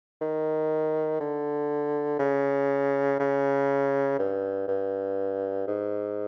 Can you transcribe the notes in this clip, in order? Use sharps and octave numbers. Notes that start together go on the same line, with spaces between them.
D#3
D3
C#3
C#3
G2
G2
G#2